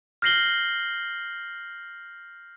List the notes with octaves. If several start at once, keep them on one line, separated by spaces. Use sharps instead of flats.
F6 G6 A#6 C7 F#7 G7